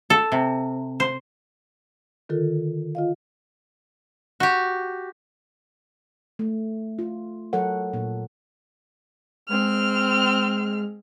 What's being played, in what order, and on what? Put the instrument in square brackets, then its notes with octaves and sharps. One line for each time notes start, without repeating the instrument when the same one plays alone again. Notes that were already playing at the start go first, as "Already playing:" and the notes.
[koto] A4
C3
C5
[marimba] D3 D#3 F4 A4 A#4
F4 D#5 F5
[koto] F#4 G4
[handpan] A3
F4
F#3 A4 A#4 C#5 F#5
A#2
[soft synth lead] G#3 [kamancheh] C4 F6